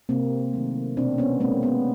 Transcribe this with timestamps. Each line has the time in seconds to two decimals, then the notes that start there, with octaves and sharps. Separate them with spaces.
0.09 C3 A#3 C4
0.53 D#3 F#3 A3
0.97 B2 C4 D4
1.18 B3 C#4
1.40 G#3 A#3 C4
1.63 B3